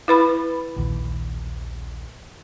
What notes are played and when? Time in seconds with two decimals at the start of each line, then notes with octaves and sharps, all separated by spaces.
0.08 E4 B4 B5
0.77 A#1 D#2